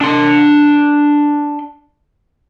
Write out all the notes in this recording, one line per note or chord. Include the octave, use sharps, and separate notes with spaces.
D4 C6